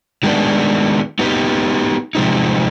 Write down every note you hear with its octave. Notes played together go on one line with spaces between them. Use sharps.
D#3 G#3 B3 D4
B3 D#4 G4 B4
C3 F3 G#3 C4 D#4